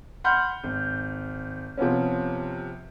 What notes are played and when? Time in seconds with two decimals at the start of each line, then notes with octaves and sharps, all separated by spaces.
0.24 F#5 B5 C6 F6 G6
0.64 G#1
1.77 C3 F3 B3 C#4